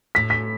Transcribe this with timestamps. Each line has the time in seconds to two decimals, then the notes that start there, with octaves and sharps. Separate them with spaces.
0.15 A2 B6
0.30 B6